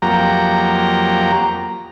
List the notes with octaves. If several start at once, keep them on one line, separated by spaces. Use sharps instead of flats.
F2 F#3 A#3 G4 A#5